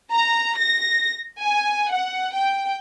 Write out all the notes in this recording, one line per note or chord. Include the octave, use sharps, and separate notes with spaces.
A#5
A#6
G#5
F#5
G5